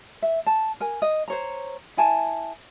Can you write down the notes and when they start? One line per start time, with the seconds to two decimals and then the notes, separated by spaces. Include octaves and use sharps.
0.22 E5
0.47 A5
0.80 A#4 G#5
1.02 D#5
1.28 C5 C#5 A#5
1.97 E4 G#5 A5